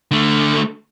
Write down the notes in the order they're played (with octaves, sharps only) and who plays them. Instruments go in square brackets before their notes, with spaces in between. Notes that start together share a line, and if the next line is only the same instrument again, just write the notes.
[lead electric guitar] D3 A3